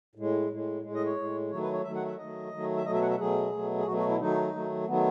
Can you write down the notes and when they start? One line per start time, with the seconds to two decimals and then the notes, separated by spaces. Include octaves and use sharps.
0.15 A2 G#3
0.49 A2 G#3
0.83 A2 G#3
0.95 D#5
1.05 C#5
1.16 A2 G#3
1.51 D#3 F#3 A3 C#5
1.62 B4
1.73 C#5
1.84 D#3 F#3 A3 E5
1.96 F#5
2.06 E5
2.17 D#3 F#3 A3 D#5
2.51 D#3 F#3 A3
2.77 E5
2.85 B2 F#3 A3 D#5
2.94 E5
3.02 F#5
3.10 E5
3.19 B2 F#3 A3 G#4
3.52 B2 F#3 A3
3.78 G#4
3.86 B2 F#3 A3 F#4
3.97 F#4
4.09 E4
4.20 D#3 F#3 A3 D#4
4.53 D#3 F#3 A3
4.87 D#3 F#3 A3 B3